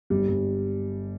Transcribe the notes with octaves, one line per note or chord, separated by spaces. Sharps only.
G1 G3
G1